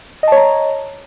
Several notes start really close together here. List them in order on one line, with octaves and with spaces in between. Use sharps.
D#5 A5 C#5 A#5